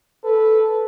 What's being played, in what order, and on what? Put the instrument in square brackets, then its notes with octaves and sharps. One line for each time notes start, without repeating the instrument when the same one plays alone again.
[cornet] A4 [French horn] B4